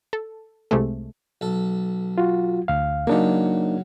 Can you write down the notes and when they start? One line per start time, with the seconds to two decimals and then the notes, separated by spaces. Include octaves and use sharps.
0.13 A4
0.71 C2 C3 G#3 A3
1.41 B1 A4
2.18 F4 F#4
2.68 D2 F5
3.07 C#3 F#3 A#3 D4 D#4